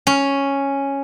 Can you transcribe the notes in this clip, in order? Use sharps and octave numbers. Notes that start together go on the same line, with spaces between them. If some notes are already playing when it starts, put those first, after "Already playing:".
C#4